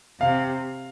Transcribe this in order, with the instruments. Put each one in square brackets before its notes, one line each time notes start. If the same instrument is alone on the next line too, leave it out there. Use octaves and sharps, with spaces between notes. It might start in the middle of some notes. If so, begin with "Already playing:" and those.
[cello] C3 [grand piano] F5